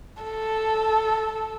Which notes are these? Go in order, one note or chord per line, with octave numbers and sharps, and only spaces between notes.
A4